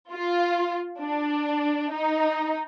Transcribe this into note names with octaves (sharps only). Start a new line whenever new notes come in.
F4
D4
D#4